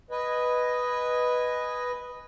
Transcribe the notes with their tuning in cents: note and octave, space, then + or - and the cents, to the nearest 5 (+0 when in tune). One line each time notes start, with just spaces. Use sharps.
B4 +0 D#5 +0 G#5 -10